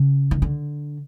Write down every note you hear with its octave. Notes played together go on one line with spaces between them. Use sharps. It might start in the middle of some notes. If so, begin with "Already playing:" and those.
Already playing: C#3
D#3
D3